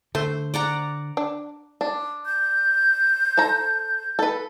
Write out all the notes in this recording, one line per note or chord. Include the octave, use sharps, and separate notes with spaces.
D3 A3 C5
D5 F#5 A#5
D4
D4
G6
A4 C5 A#5
A4 B4